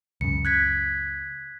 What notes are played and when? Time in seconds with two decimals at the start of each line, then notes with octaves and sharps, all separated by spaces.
0.21 C#2 F#2 C#3 C#7
0.45 F#6 G#6 B6